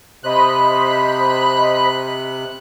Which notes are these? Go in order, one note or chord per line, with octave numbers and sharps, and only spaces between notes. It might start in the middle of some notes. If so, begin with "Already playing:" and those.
C3 C5 D#5 B5 F#6